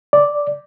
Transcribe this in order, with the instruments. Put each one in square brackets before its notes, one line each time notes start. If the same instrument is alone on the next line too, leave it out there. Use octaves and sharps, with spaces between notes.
[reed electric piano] D5